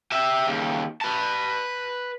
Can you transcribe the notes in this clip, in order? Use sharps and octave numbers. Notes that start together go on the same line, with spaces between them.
G4 E5
D#2 C#3
B4 A5